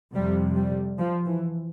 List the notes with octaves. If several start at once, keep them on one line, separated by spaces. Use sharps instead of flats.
F2 C3 G3
G3
F3
E3